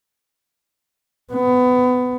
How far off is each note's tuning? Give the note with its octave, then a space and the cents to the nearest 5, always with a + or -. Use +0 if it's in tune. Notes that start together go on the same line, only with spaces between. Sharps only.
B3 +20